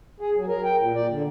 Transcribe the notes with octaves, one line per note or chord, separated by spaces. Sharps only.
G#4
F#3
A#4
G5
A#2
D5
D3